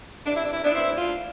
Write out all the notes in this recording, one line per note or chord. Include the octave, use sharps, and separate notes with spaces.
C3 E3 D4
E4
D4
E4
B3 D4
D2 C4 E4
D4 F4